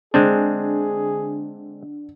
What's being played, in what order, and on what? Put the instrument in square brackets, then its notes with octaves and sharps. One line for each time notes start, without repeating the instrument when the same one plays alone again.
[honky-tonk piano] D3 [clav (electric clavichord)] G#3 C4 D4 [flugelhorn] G#4